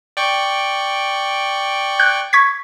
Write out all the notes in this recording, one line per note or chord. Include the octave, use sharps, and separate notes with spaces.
D5 G5 C#6
F#6 G6
C#6 G#6 B6